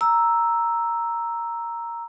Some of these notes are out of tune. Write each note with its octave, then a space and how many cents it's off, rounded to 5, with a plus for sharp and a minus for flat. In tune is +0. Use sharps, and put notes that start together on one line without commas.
A#5 +0 E6 +0